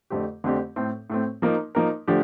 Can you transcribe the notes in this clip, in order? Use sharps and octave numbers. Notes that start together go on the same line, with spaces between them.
F2 D3 A3 C4 G4
F2 D3 A3 C4 G4
A2 A3 C4
A2 A3 C4
F3 A#3 D#4 A#4
F3 A#3 D#4 A#4
D3 F3 A3 D4 G4